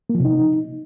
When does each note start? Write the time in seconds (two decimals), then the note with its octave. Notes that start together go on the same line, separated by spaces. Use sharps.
0.10 A#3
0.15 F3
0.20 C3
0.25 D#4